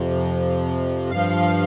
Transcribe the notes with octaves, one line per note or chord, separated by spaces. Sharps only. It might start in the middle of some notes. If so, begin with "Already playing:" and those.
Already playing: F2 C3 F3
G2 F3 F5